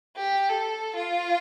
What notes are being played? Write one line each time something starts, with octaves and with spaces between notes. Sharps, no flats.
G4
A4
F4